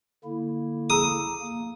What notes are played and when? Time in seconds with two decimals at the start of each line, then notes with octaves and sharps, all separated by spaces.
0.24 D3 A#3 E4
0.90 G#4 A#5 D#6 E6
1.41 A#3